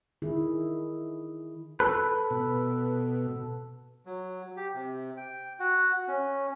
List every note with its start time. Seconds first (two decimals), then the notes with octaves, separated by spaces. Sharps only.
0.22 D#3 E4 G#4
1.80 A4 B4
2.30 B2
4.06 F#3
4.57 G4
4.74 C3
5.17 G5
5.60 F#4
6.08 C#4